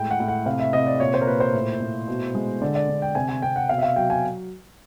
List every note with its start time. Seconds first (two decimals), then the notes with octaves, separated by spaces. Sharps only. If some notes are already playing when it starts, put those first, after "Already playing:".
Already playing: A2 G#3 G5
0.11 F#5
0.20 A2
0.28 F#5
0.46 C3 F5
0.60 E5
0.73 C3 D#5
0.87 D5
1.00 A#2 C#5
1.14 C5
1.21 A#4
1.27 A#2 B4
1.40 C5
1.54 A2
1.81 A2
2.08 B2
2.35 G#3
2.62 D3 D5
2.75 D5
2.89 D3
3.02 G5
3.15 C3 G#5
3.29 G#5
3.42 C3 G5
3.56 F#5
3.69 B2 F5
3.78 E5
3.83 F5
3.96 F#3 G5
4.10 G#5